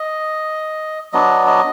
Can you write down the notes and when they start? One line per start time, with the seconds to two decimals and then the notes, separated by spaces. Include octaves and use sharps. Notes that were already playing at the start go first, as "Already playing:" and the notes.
Already playing: D#5
1.13 F#3 B3 D4 D#5
1.47 D#5